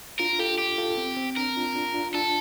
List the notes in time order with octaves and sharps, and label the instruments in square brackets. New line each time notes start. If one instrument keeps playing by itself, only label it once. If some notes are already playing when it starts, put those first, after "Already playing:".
[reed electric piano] D4 F4 [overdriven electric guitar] A#4
[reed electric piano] F4 A4 [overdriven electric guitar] G4
[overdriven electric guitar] G4
[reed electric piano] F4 A4
C4
C4
[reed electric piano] D4 [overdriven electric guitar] A#4
[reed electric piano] D4 F4
D4 F4
D4 F4
[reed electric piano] D4 F4 [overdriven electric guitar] A4